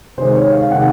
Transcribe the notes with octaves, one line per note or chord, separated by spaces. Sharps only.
C3 D#3 G#3 C5
C#5
F5
C3 D#3 G#3 F#5